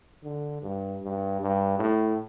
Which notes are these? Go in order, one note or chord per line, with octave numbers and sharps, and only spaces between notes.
D3
G2
G2
G2
A2